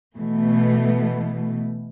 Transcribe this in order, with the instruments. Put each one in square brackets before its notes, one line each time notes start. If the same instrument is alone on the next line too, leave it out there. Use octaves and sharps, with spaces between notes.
[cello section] B2 E3 A3